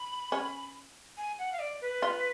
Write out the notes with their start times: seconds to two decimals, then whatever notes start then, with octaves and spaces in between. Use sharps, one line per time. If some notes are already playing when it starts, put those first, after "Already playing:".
Already playing: B5
0.32 C#4
1.17 G#5
1.39 F#5
1.52 F5
1.59 D5
1.81 B4
2.02 F4